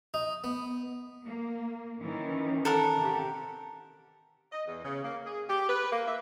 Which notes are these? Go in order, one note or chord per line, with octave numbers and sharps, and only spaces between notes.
D#4
B3
A#3
D#3 E3 C#4
A4 A#4 F#5
C3 G4
D#5
E2
C#3
A#3
G#4
G4
B4
A#3
E5